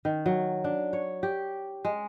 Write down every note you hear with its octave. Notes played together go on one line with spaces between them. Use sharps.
D#3
F#3
D4
C#5
G4
G#3